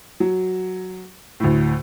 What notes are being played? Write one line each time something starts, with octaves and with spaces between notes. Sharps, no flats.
F#3
D2 A2